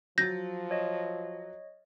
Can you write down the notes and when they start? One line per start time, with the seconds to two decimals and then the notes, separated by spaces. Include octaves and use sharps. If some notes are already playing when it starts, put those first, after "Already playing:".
0.18 F3 F#3 G6 A6 A#6
0.71 C#5 D#5